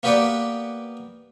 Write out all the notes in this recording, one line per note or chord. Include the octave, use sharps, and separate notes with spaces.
A#3 B3 G4 B4 D5 F#5